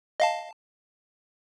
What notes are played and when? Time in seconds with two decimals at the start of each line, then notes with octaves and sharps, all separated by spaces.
0.20 D#5 F5 A5